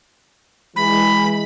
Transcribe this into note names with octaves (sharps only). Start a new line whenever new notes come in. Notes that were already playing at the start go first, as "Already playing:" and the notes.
E3 G#3 B5